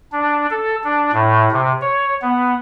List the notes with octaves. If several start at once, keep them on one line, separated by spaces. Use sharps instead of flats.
D4
A4
D4
A2
C3
C#5
B3